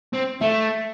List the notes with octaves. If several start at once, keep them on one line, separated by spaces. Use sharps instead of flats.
C4
A3 E5